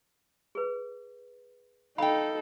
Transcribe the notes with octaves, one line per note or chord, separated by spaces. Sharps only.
G#4 B4
D#4 A4 F5 G5 B5